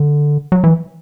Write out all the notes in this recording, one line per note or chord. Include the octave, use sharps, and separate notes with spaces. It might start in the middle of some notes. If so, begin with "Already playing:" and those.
Already playing: D3
F#3
E3